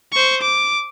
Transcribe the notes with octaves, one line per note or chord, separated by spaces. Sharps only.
C5 C#6
D6